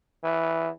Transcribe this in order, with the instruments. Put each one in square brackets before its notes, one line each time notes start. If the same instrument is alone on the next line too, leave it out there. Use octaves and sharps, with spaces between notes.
[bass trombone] E3